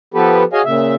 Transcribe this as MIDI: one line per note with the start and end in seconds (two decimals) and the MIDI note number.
0.14 0.43 53
0.14 0.43 59
0.14 0.43 67
0.14 0.43 69
0.14 0.43 71
0.53 0.62 66
0.53 0.62 68
0.53 0.62 73
0.53 0.62 75
0.53 0.62 77
0.53 0.62 80
0.65 0.95 46
0.65 0.95 49
0.65 0.95 76